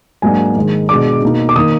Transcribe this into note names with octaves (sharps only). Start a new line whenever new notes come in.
G#2 F#3 A#3 D4 G#5
G#2 D#3 G#3
B2 G#3 D4 D6
B2 A#3 D#4
D6
D#3 A#3 D#4 D#6